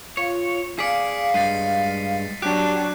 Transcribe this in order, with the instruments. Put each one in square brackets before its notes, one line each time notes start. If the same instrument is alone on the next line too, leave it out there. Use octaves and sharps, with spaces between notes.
[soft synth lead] F4 [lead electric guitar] C#5
[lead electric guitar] G#4 D5 [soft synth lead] F5 [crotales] B6 C#7
[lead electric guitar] G2 G#3 [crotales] A6 C7 D#7
[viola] F#3 D4 [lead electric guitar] G4 [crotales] F#6